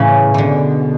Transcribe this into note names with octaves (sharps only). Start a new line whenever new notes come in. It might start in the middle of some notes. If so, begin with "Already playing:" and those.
Already playing: A2 C#3 E3
B2 D3 E3